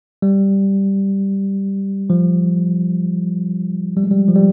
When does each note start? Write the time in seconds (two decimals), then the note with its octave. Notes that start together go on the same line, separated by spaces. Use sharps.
0.22 G3
2.10 F3
3.97 G3
4.04 G#3
4.11 G3
4.28 F3
4.35 G3